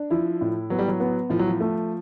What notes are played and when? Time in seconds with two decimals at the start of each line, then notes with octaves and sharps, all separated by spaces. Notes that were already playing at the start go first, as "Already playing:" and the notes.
Already playing: D4
0.10 F3 E4
0.41 A2
0.70 F#3 B3
0.79 G3
0.88 F#3
1.00 B3
1.30 A2 F3
1.39 F#3
1.48 F3
1.60 A3